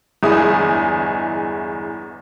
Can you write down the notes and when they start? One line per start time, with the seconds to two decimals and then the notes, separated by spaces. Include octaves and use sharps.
0.23 G1 E2 G#3 E4 G#4 D#6